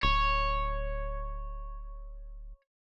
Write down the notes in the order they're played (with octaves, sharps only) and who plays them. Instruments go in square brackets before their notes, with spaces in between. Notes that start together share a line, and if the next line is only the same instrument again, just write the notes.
[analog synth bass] D1 [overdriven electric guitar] C#5